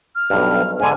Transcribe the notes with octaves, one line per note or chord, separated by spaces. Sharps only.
F6
B1 G2
G#2 D3 G#5